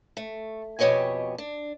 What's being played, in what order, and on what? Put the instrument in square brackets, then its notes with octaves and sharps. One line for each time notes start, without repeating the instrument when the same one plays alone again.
[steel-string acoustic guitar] A3
F2 B2 G4 C#5 D#5 G#5
D4